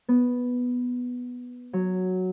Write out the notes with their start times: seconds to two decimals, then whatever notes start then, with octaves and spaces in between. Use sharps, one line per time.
0.08 B3
1.73 F#3